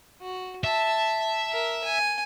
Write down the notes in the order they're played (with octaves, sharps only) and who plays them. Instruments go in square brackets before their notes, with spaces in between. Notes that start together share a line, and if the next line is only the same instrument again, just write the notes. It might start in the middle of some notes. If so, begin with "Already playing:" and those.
[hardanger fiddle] F#4
[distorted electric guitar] E5 [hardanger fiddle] A5
[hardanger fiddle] A#4
G#5